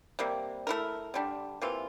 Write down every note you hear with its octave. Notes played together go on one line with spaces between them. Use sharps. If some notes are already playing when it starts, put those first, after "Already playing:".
C3 G3 A#3
A3 E4 A#4
D3 G3 D4
C3 E3 A#3 F4